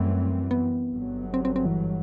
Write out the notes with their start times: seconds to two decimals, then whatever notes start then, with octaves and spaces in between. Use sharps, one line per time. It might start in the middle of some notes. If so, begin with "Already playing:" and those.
Already playing: F#2 E3 G3 A3 C4
0.51 B3
0.92 G1 G2 F#3
1.34 C4
1.45 C4
1.56 C4
1.66 E3